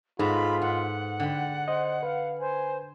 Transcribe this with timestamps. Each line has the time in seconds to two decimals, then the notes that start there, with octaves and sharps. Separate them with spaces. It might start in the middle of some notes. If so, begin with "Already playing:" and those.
0.19 G#2 B3 D#4 F4 G#4 A4 A#5 B5
0.62 G#2 F#5
1.20 D3 G5 B5
1.68 C5 D#5
2.03 B4 F5
2.40 C5 G#5